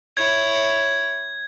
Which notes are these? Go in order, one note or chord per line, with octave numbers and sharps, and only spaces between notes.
E4 C#5 G#6